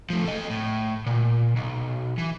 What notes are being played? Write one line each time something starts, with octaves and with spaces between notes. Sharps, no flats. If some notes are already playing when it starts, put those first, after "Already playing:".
F3 A3
A4 D#5
A2
A#2
B1
E3